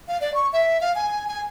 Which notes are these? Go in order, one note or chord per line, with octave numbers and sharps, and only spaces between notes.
F5
D5
C#6
E5
F5
G#5
G#5